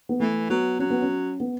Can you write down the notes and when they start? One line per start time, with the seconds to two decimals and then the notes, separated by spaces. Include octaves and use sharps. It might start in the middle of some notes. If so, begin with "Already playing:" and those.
0.09 B3
0.20 E3 A3
0.50 F#3 B3
0.79 F#3 C#4
0.90 B3
1.02 C#4
1.40 B3